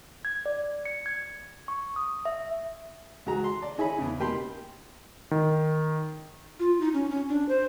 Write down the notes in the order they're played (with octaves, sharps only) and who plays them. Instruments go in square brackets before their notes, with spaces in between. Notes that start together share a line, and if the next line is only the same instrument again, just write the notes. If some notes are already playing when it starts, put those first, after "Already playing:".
[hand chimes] G#6
D5
C#7
G#6
C#6
D#6
E5
[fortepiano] C#2 F#4 G#4 A#5
C6
D5
D#4 E4 G#4 C#5 G#5 B5
E2 C#3
B2 A#3 G4 G5 B5 C6
[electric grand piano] D#3
[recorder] F4
D#4
C#4
C#4
D4
C5